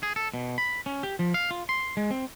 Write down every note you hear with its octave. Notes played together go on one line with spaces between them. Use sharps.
G#4
A4
B2
B5
C#4
G4
F3
F5
F4
C6
G#3
C4